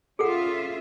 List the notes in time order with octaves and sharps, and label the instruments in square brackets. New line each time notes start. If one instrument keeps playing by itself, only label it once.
[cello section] C#4 F4 E5 [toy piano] G#4 A4 F#5